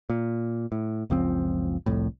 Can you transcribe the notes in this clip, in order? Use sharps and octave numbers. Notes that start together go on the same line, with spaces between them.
A#2
A2
F#1 C#2 F3 C4
C2 F2 A2